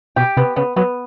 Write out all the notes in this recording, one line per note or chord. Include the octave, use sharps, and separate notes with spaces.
B2 G4
C3 B3
C#3 B3
F#3 B3